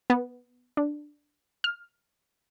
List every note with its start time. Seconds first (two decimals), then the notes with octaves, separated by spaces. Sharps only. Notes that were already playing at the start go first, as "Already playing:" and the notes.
0.10 B3
0.77 D4
1.64 F6